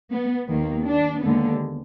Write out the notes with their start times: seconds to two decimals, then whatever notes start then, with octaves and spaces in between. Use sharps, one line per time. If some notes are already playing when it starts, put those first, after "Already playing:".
0.11 B3
0.47 D#2 D#3 A#3
0.85 D4
1.22 D#2 D3 G#3 B3